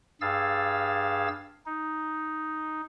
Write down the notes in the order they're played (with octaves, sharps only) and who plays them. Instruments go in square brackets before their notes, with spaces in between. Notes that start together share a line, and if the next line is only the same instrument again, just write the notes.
[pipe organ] G2 G#4 F5 E6 A6
D#4